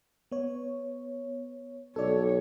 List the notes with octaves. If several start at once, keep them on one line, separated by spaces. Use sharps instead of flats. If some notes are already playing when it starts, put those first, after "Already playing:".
B3 C#5
B1 A4 C#5 D5